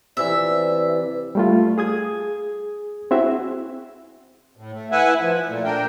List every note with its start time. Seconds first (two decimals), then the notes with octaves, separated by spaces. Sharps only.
0.17 C3 E3 D5 E5
1.35 G3 A3 F4
1.78 G#4 D#6 G#6
3.11 C4 E4 F#4 G#4 E5
4.57 A2
4.72 A3
4.92 E4 B4 E5 F#5 G#5
5.20 F3
5.48 A#2 A3
5.64 D4 A#4 G5